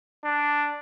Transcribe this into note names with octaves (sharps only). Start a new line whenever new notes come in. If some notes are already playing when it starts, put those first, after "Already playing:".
D4